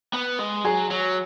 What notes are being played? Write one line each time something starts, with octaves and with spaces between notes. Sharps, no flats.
B3
G#3
F#3 G#4
F#3